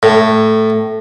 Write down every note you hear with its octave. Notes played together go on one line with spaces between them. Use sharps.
A2